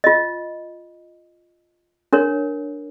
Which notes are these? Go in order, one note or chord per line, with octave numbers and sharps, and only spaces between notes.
F4 D#5
D4 A#4 C#5